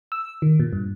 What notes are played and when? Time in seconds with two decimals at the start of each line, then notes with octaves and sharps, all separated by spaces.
0.12 E6
0.42 D#3
0.60 A#2
0.73 G2